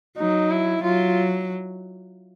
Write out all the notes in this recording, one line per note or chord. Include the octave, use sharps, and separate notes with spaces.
F#3 D#4
E4
F#3 F4